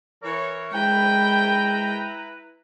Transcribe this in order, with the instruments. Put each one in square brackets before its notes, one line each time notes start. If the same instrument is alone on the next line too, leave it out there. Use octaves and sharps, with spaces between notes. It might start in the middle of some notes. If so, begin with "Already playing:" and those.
[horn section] E3 A#4 C#5
[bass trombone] G#3 [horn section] E4 B4 A#5 [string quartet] G5